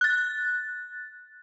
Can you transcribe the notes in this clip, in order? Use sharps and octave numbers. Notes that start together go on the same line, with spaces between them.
F#6 A6